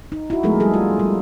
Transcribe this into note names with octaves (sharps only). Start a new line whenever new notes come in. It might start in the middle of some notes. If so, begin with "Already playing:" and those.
D#4
E4 F#4
F3 G#3 A3 B3 G#4 A#4
G3 G#4 A4
F4
G3